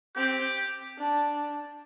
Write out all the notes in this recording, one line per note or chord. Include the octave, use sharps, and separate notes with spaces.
C4 G4
D4